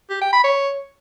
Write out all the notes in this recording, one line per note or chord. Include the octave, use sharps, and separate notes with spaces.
G4
G5
B5
C#5